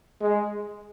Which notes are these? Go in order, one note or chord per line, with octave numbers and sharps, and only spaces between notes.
G#3